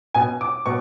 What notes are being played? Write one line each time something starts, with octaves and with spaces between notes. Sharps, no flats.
B2 G#5
D6
B2 C#6